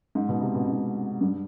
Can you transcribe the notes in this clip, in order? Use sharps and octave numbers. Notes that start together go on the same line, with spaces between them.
G#2
B2
C3
B2
G#2
G2